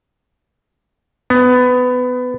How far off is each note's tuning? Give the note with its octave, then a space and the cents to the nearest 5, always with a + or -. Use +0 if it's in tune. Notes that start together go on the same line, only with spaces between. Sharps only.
B3 +20